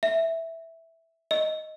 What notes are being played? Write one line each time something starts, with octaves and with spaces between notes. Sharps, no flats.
E5
D#5